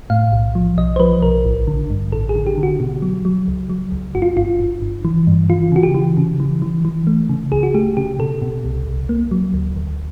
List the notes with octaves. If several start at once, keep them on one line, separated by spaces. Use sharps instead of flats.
A2 F5
B1
F3
B1 D#5
C5
F3 B4
B1 A#4
A1
D3
G2
A1 A4
G#4
D3
G4
D3
F#4
B2
F#3
F#3
C#2
F#3
C#2
G1 F#4
F4
G1 F4
G1
G1
E3
G2
E3 F4
C#3 F#4
G4
E3
C#3
E3
E3
E3
A3
C#3
C#2 G#4
F#4
A3 G4
C#3 G4
B2 A4
B2
C2
C2
A#3
F#3
D2
D2